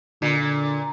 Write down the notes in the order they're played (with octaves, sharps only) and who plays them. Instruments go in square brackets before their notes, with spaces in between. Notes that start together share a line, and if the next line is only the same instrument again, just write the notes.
[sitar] A#2 [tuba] D3